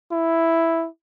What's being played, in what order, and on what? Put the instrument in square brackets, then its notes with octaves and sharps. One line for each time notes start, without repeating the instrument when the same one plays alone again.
[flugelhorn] E4